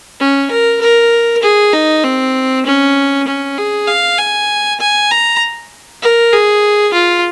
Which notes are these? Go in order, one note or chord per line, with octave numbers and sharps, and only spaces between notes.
C#4
A#4
A#4
G#4
D#4
C4
C#4
C#4
G#4
F5
G#5
G#5
A#5
A#4
G#4
F4